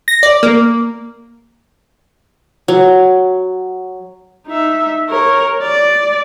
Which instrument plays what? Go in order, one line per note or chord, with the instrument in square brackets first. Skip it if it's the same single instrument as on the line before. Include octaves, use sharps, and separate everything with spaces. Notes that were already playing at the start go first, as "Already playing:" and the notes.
[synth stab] A#6
D5
A#3
[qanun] F#3
[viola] D#4 E5
A#4 C#5
D5